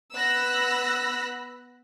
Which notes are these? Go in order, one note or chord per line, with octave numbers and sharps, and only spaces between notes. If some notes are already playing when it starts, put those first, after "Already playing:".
B3 B5 E6 F#6 A#6